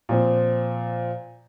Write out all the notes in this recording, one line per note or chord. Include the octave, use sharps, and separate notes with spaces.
A#2 F3 C4